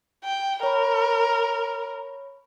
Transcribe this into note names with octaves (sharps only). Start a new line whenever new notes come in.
G5
A#4 C#5 B5